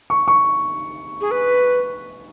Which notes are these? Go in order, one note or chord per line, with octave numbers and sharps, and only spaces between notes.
C#6
C#6
G#4
B4